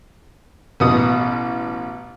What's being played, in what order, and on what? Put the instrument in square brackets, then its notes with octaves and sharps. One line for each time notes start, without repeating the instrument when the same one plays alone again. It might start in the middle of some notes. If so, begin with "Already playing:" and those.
[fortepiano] A1 B2 D#6